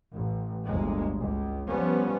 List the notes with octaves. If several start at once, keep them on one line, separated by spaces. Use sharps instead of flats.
A1
G1 D2 G#3 A#3
C#2
F3 G3 B3 C#4